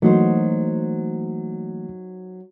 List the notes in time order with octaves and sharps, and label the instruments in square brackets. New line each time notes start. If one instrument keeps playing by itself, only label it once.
[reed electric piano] E3 A3 A#3 [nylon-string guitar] F#3 D#4 C5